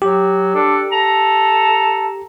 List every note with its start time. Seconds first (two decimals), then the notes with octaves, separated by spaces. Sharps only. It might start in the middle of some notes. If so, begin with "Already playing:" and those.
0.02 F#3 G4
0.55 D4 A4
0.92 A4 A#5